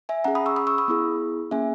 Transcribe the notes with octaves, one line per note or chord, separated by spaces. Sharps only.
E5 G#5
C#4 G#4 F#5 A#5
B5 D#6
C#6 E6
B5 D#6
C#6 E6
B5 D#6
B3 E4 G#4
A#3 C#4 G#4 E5 G#5